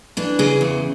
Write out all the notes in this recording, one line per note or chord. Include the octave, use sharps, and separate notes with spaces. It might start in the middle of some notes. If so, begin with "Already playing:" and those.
E3 D4
C#3 G#4
E2